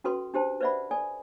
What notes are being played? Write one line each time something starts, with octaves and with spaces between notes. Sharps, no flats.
C#4 F#4 A4 B4 C6
D4 G4 C5 A5
B4 C5 D5 E5 F#5 B5
A4 D5 G#5